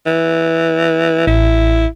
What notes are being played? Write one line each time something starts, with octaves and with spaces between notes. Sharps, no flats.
E3
A1 E4